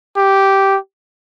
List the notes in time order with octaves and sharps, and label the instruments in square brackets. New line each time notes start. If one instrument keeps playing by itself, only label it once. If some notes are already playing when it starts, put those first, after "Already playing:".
[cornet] G4